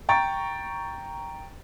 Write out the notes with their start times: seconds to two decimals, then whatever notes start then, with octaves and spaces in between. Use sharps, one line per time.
0.09 G5 A#5 C#6 A6